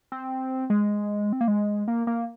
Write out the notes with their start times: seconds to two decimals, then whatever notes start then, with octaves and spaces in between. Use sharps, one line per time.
0.12 C4
0.70 G#3
1.33 C4
1.41 A#3
1.48 G#3
1.88 A#3
2.07 A#3